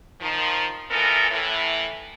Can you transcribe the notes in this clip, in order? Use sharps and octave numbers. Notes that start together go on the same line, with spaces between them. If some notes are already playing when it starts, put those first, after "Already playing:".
D#3 F3
A#2 E3 B3 A4 A#4
A2 E3